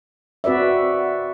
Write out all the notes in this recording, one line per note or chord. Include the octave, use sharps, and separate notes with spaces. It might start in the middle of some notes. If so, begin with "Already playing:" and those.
C4 F#4 B4 D5 E5